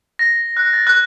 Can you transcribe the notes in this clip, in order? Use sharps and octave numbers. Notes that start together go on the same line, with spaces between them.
A#6
F#6
A6
F#6